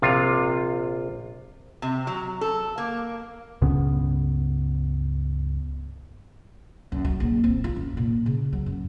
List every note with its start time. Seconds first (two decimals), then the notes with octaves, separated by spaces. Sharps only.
0.02 A#1 C3 F4 F5
1.82 C3
2.07 F#3
2.41 A4
2.78 A#3
3.61 C#2 G2 C#3 B3
6.92 F#2
7.05 F#3
7.20 A#1
7.44 C4
7.64 F4
7.76 F#2
7.97 A#2
8.26 C#3
8.53 F#3
8.66 F#2